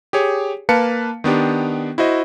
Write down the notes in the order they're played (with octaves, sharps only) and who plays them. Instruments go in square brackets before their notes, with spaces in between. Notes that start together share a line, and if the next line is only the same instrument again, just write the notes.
[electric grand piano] G4 G#4 C#5
A#3 B4 F5 A5 C#7
D#3 B3 D4 G4
E4 F#4 C5 D#5